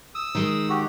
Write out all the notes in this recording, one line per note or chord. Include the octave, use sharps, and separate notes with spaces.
D#6 E6
D#3 G#3
F#4 G4